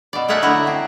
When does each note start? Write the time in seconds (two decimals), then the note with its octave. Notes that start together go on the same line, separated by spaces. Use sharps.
0.13 B2 D5
0.28 A3 G#4 A#4 E5 F#5 A5
0.42 D3 F#3 E4 A5 A#5
0.67 C4